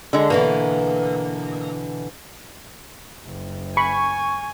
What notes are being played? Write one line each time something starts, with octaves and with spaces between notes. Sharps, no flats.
D3 G#3
B2 D3 E3 A#3
F#1
G#5 B5 C#6